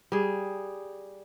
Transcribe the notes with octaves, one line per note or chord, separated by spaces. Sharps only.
G3 G#4